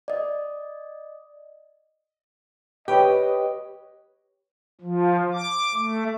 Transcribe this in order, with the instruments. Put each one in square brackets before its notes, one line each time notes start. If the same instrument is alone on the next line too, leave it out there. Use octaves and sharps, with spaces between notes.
[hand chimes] D5 D#5
[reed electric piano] G4 B4 C#5 [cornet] D#5 [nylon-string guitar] G5
[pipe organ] F3
D6
A3